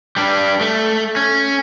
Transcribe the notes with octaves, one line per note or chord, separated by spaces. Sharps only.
G3 D4
A3
C#4